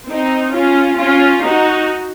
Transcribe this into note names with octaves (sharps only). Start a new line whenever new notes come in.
C4 D#4
C#4 F4
C#4 F4
D#4 F#4